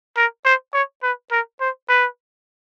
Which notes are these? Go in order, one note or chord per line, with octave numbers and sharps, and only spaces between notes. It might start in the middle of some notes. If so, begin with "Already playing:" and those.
A#4
C5
C#5
B4
A#4
C5
B4